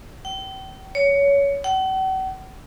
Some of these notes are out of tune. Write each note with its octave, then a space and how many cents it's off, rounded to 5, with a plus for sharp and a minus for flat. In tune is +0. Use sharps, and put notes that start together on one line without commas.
G5 -35
C#5 +20
F#5 +45